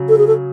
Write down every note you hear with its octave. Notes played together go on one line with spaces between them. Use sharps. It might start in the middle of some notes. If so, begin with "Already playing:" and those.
Already playing: C#3 F#3
A4
G#4
A4